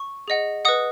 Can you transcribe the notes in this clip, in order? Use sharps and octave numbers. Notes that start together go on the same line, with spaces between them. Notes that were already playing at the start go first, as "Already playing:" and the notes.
Already playing: C#6
G#4 D#5 F#5
B4 D#5 F#5 D#6